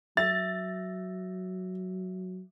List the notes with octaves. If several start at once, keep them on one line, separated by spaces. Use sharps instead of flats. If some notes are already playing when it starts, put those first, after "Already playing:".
F#3 E5 A6